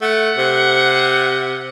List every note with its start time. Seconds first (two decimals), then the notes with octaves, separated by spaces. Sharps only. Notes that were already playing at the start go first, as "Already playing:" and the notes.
0.01 A3 F#5
0.37 C3